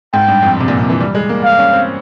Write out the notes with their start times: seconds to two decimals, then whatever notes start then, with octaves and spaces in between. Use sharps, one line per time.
0.13 G#2 G5
0.28 G2
0.43 F2
0.60 C3
0.68 A#2
0.79 C3
0.90 E3
1.00 G3
1.15 G#3
1.29 A#3
1.44 F5
1.59 C#4
1.73 C4